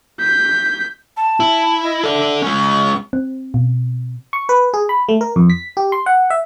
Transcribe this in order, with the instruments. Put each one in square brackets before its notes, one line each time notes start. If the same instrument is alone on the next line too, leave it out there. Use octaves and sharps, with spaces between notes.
[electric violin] G6 B6
[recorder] A5
[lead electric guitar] E4
[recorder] D#5
[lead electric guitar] A4 D5 [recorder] E5
[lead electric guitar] G#3 C#4 [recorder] C#6
[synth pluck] C4
B2
[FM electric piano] C#6
B4
G#4
B5
A3
A#4
F2
B6
G4
C6
F#5
E5